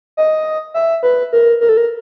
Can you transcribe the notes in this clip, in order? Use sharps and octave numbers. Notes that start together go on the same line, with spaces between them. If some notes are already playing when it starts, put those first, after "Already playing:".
D#5
E5
B4
A#4
A#4
A4
A#4